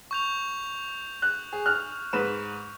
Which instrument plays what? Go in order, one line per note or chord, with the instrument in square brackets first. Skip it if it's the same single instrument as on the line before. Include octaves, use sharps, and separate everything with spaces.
[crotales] C#6 G6 F7
[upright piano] F#6
G#4
F6 F#6
G#2 B4 E7